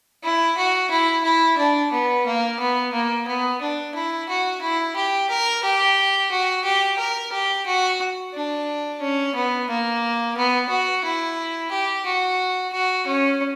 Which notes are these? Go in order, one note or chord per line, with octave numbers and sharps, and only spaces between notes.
E4
F#4
E4
E4
D4
B3
A#3
B3
A#3
B3
D4
E4
F#4
E4
G4
A#4
G4
F#4
G4
A#4
G4
F#4
D4
C#4
B3
A#3
B3
F#4
E4
G4
F#4
F#4
C#4